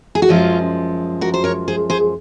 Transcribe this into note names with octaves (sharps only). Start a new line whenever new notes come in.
G#4
F#4
F#2 F3 G#3 C#4 F4
F#4 A#4
C5
A#4 C#5
G#4 C5
G#4 C5